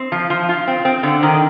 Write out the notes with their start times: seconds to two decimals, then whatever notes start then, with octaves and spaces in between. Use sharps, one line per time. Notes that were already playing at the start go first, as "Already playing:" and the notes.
Already playing: C4
0.12 F3
0.30 F3
0.49 F4
0.67 C4
0.85 C4
1.03 D3
1.23 D#3